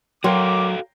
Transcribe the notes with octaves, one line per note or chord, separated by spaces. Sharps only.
F#3 F#4 A4 A#4 F5 G5 C6 D6